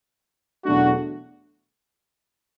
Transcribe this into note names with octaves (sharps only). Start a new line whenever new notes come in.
E2 B2 F#3 A3 D4 F#4